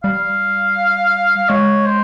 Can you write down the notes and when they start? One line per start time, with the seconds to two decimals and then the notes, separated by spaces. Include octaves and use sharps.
0.04 G3 F5
1.49 G#3 C#5
1.86 C5